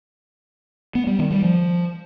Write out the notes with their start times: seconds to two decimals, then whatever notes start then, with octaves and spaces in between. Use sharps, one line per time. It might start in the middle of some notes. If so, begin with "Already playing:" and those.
0.95 B3
1.07 G3
1.19 D#3
1.31 G3
1.42 F3